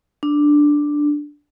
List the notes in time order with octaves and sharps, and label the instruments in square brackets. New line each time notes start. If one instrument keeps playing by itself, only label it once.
[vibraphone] D4